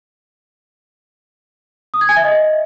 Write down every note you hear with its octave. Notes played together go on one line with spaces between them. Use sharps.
D#6
G#6
G#5
E5
D#5